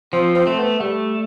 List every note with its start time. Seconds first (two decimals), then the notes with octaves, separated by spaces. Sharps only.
0.13 F3 C4
0.35 C4
0.47 A3
0.58 B3
0.81 G3 A3